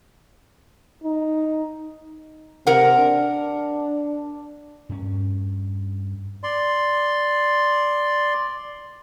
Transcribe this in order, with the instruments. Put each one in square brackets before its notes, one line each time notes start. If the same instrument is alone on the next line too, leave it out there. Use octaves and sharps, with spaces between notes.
[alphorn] D#4
[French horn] C3 [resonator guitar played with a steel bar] A#4 F#5
[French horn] D4
[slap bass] G2 C#4
[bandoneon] D5 C6